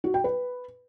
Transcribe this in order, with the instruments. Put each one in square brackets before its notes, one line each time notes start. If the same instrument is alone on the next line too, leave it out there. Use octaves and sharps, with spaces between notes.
[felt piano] F#4
G5
B4